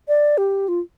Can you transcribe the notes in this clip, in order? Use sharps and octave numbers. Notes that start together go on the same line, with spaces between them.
D5
G4
F4